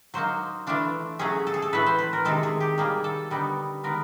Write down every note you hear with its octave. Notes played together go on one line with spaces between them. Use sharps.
F#3 A#3 D#4 C5
E3 A3 D4 F4
F#3 A3 C#4 G#4
A4
G#4
A4
A2 E3 A3 B4
C5
B4
A#4
C3 D#3 G#3 A4
G#4
G4
D#3 G3 A#3 G#4
A4
D3 G3 B3 D#4
D#3 G#3 B3 A#4